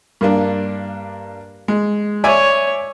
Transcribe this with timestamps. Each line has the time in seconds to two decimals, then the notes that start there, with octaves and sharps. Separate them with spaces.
0.21 G2 A#3 D4
1.68 G#3
2.24 C#5 D5 E5 G#5